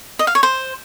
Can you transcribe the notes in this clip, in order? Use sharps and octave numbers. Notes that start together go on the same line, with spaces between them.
D#5
F5
C#5
C5